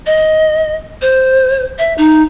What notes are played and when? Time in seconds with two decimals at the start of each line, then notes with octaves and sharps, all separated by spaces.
0.06 D#5
1.02 C5
1.78 E5
1.98 D#4